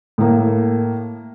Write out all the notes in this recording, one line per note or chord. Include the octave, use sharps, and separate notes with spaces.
A2 A#3